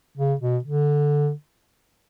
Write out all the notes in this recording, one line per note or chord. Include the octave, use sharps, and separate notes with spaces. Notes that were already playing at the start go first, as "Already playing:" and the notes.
C#3
B2
D3